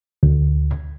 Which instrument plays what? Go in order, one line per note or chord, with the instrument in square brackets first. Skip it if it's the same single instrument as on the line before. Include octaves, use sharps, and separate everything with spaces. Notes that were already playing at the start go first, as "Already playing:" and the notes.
[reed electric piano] D2